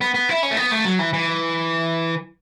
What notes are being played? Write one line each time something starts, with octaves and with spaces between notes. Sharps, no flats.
B3
B3
E4
C#4
A3
B3
A3
F#3
E3
E3